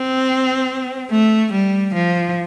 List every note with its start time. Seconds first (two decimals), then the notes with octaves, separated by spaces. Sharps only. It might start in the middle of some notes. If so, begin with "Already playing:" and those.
Already playing: C4
1.11 A3
1.53 G3
1.95 F3